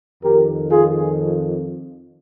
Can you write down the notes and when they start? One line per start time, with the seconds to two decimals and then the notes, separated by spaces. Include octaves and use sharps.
0.24 F2 D#3 G4 A#4
0.71 F4 G#4